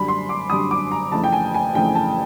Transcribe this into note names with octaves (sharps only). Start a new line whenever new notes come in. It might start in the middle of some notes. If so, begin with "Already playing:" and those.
Already playing: F#2 D3 G3 B5
C6
D6
F#2 D3 G3 D#6
D6
A#5
F2 C#3 E3 A3 A5
G5
G#5
G#5
F2 C#3 E3 A3 G5
A5